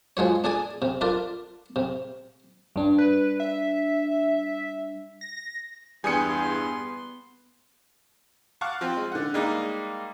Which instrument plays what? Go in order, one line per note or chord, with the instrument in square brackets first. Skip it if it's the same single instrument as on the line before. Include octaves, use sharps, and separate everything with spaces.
[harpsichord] F3 G#3 F#4 C#5
D4 G#4 D5 G#5
C3
D4 F4 A#4 D5
C3
[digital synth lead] G2 [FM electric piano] G3 D4
[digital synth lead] B4
E5
A#6
[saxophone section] E2 G2 [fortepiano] G3 [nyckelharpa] B3 C6 [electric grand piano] G#5 D#6 C#7
[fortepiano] F5 F#5 A5 C#6 D6 F#6
F3 C4
G#3
D3 F#5
G3 G#3 A#3 D#4